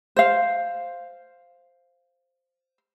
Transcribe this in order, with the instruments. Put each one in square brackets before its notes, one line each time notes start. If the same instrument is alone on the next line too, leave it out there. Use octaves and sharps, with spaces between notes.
[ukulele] C5 F5